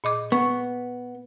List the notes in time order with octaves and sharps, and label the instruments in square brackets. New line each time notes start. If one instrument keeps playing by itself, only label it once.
[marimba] A#2 D#5 D6
[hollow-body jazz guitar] B3 [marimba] C#6